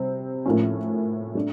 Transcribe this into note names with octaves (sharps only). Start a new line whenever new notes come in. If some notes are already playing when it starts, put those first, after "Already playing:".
Already playing: C3 G3 C4
A2 F3 A#3 C#4
A3 D4